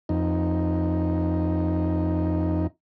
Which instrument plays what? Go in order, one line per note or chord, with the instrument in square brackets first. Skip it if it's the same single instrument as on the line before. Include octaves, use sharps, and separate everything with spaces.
[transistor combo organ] F2 D#4